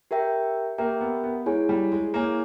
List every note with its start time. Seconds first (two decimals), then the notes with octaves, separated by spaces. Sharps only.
0.11 G4 A#4 E5 G5
0.78 A#3 G4 A#4 E5 G5
1.01 B3
1.24 B3
1.46 G#3 E4 G#4 C#5 G#5
1.69 G3
1.92 G#3
2.14 A#3 E4 G#4 C#5 G#5